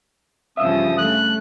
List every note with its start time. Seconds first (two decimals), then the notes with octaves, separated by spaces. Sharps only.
0.57 G2 C#3 F3 E5 F5 D#6 E6
0.98 A3 F#6